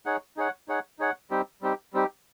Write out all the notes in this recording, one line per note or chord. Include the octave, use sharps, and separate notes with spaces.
D#4 G#4 C#5 F#5
D#4 G#4 C#5 F#5
D#4 G#4 C#5 F#5
D#4 G#4 C#5 F#5
G3 C4 D#4 G4
G3 C4 D#4 G4
G3 C4 D#4 G4